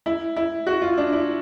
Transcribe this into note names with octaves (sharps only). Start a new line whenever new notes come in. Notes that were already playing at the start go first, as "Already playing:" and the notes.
E4
E4
F#4
F4
D4
E4